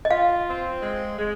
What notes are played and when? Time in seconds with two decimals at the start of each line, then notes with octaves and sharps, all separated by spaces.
0.05 D#5
0.11 F4 F5
0.47 C4
0.83 G#3
1.19 G#3